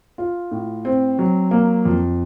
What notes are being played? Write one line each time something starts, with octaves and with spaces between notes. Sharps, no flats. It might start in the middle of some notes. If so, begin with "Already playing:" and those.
F4
A2
C4
F#3
A#3
F2